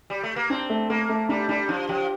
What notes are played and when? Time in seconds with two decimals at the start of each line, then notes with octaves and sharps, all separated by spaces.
0.10 G3
0.23 A3
0.36 A#3
0.50 C4 D4
0.70 A3
0.90 A3 A#3
1.09 A3
1.29 G3 D4
1.49 G3 D4
1.69 F3 D4
1.89 F3 G4